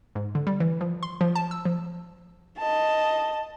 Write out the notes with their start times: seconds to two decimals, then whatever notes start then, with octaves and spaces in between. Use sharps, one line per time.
0.15 G#2
0.35 D3
0.47 G3
0.60 E3
0.81 F3
1.03 C6
1.21 F3
1.35 A5
1.51 E6
1.65 F3
2.58 D#5 A5